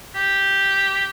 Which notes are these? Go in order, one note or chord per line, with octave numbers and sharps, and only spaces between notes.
G4